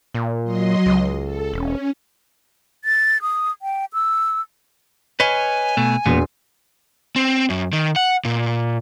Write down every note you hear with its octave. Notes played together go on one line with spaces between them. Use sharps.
A#2
F#3 D#5 C6
C#2
A4
E1 C#4
A6
D#6
G5
E6
B4 C#5 D#5 G#5 F6 G#6 C7
B2 A3
E1 A#2 B3 C6
C4
F#2
D#3
F#5
A#2